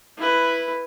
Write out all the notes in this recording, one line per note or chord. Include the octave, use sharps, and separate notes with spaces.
E4 B4